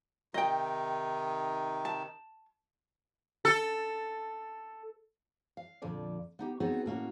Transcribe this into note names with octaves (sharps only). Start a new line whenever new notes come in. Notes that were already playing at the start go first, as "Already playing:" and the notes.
C3 D#3 D#4 D#5 G5
A5
A4
F5
F2 A#2 D3 F3 D5
B3 D#4 G4
B3 C4 D#4 F#4 G#4 C#5
A2 A#3 C#4 F#4